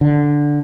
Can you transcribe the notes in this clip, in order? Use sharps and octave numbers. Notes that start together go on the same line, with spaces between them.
D3